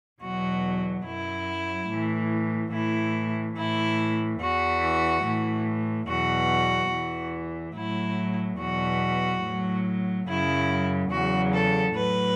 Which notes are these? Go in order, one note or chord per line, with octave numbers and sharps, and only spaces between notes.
E2 B2 F#3 F#4
F#2 F#3 E4
A2 E3
A2 E3 E4
A2 E3 E4
E2 E3 F#4
A2 E3
E2 B2 F#3 F#4
E2 E3
A2 F#3 E4
E2 B2 F#3 F#4
A2 F#3
F#2 C#3 F#3 E4
E2 C#3 F#3 F#4
A4
A2 F#3 B4